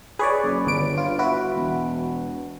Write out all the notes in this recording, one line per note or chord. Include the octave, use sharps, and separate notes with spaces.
G#4 B4 C#5 D5
F#1
G1 D3 D7
F4
E4 F#4 B4
E1